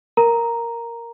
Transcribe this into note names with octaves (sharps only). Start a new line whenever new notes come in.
A#4 A#5